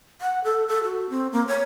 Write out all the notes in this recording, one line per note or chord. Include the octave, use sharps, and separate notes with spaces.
F#5
A4
A4
F#4
C4
A#3
C#5